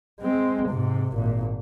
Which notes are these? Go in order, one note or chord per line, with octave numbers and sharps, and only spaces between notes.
G#3 C4
G#2 C3
G#1 A#2